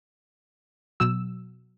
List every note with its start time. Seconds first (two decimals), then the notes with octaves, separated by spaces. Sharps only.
1.00 B2 F#3 E6